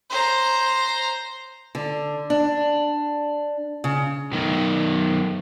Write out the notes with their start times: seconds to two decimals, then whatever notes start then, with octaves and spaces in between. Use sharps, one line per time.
0.10 C5 A#5
1.75 D3
2.30 D4
3.84 C#3
4.32 B1 D#3